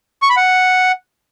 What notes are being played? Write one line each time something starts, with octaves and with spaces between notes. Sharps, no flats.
C#6
B5
F#5